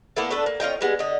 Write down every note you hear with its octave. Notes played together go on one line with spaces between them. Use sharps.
A#3 B3 E4 A4
A3 D4 A4 B4
A#3
C#4 F4 D#5 G5
G3 G#3 B3
D3 D#5